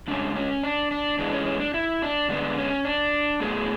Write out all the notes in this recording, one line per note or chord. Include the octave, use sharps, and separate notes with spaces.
C#3 G#3 C#4 D4
C#4
D4
D4
E3 G#3 B3 D4
C#4
C#4
D4
E4
D4
D3 G#3 B3 D4
C#4
D4
A2 F#3 B3 G#4